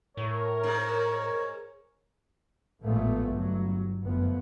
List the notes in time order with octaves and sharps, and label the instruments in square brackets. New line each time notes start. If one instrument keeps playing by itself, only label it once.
[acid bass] A2 [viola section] A#4 [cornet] C#5
[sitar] G#2
[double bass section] A1 A#2 F3 G#3 A3 B3
G1 G2 F#3
F#1 D2 F3 B3